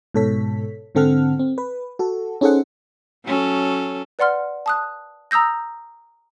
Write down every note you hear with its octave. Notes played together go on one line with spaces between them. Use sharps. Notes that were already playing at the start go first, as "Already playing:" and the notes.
G#2 B2 A4 C#5 B6
G#2 D3 C4 A4 F#5 F6
C4
B4
F#4 A4
C#4 D#4 G#4 A4 C5 F#5
F#3 C#4 A4
B4 D5 F#5 C6 F6
A5 D#6 F#6
A#5 D#6 E6 G6 A#6